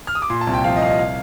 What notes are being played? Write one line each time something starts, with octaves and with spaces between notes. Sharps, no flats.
F6
D#6
D6
A#2 C6
A5
C2
G5
F3 F5
D#5
C2 F5
D#5
F5